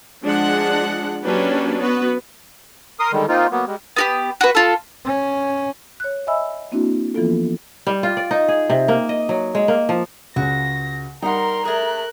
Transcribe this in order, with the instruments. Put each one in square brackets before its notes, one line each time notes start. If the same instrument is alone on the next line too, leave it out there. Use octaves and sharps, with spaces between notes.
[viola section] F3 G#3 D4 F#5
F#3 A#3 C#4 D4 G4 B4
B3 F#4 B4
[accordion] A#4 C6 D#6
D3 D#3 G3 G#3
A#3 C4 D#4 F4
F#3 A#3 B3
G3 G#3
[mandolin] B3 F#4 G4
F#4 B4
F4 A4
[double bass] C#4
[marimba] C#5 F#6
D#5 E5 G#5 B5 E6
A#3 C4 D4 E4 F#4
E3 F3 A#3 B3 F4 A4
[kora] G3
F4
D5
D#4
G#4
C3
A#3
D#5
F#3
G#3
A#3
F3
[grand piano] C#2 C#3 [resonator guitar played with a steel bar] F#4 [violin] A#6
[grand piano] G3 [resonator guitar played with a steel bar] D#4 F#5 [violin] A#4 C6 [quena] A#5
[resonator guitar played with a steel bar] A3 G#4 [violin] A#4 F#6